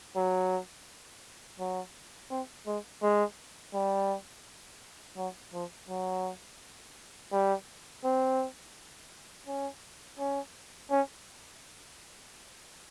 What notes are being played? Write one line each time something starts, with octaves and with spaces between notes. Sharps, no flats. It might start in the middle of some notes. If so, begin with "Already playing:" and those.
F#3
F#3
C4
G#3
G#3
G3
F#3
F3
F#3
G3
C4
C#4
C#4
C#4